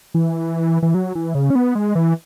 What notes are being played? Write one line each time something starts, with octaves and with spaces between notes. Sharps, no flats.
E3
E3
F#3
E3
C#3
C#4
B3
G#3
E3